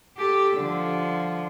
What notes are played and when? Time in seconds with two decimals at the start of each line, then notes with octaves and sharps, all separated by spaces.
0.17 G4 A4
0.57 D3 F3